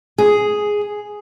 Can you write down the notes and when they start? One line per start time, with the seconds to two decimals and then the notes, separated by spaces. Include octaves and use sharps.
0.18 G#4